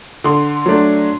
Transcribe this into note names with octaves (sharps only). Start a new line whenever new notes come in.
D3 C6
F#3 A3 D4